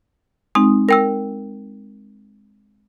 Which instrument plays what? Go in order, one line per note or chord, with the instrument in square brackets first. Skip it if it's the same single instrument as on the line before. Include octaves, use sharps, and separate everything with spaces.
[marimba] G#3 C4 D#4 [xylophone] D#6
[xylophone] A#4 G5 E6 [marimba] A#6